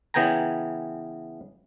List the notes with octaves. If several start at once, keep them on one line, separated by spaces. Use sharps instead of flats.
C#3 E3 B3 G5 G#5 A#5